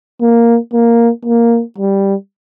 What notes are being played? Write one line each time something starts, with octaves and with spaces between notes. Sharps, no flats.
A#3
A#3
A#3
G3